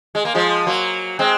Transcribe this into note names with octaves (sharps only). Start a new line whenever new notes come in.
G#3
A#3
F3 G#3
F#3 A#3
G#3 C4